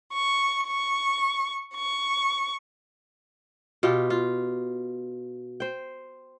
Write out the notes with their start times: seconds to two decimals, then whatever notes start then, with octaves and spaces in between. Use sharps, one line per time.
0.13 C#6
0.66 C#6
1.75 C#6
3.83 B2 F4 G4
4.10 F4
5.60 C5 G5